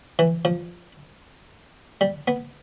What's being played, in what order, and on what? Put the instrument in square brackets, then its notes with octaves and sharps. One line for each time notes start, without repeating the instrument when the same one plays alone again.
[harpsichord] E3
F3
G3
B3